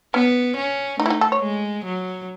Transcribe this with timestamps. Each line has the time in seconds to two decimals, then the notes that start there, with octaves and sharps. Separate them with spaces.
0.14 B3 C#4
0.57 C#4
1.00 A3 D#4
1.06 E4
1.10 D#4
1.21 A4
1.32 C#5
1.42 G#3
1.85 F#3